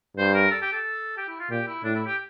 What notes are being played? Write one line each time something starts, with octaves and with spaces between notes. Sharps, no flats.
G2 C5
A#4
A4
G4
A4
G4
E4
F4
A#2 G4
E4
A2 D4
E4
G4